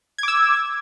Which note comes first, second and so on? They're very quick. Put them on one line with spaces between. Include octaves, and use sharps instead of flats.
G#6 D6 E6